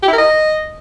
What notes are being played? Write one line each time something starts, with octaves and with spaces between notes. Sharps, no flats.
G4
E4
A#4
D#5